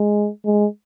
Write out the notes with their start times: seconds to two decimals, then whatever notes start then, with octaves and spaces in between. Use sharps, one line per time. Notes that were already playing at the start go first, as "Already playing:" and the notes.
Already playing: G#3
0.45 G#3